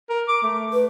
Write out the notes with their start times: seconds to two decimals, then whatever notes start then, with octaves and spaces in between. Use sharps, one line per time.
0.10 A#4
0.28 D6
0.42 A3
0.73 B4